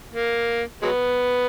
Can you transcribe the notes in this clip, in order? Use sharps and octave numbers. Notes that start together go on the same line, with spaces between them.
A#3
F#3 G#3 B3